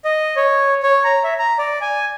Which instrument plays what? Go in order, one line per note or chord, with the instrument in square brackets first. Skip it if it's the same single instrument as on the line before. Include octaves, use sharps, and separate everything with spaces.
[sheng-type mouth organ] D#5
C#5
C#5
A#5
E5
A#5
D5
G#5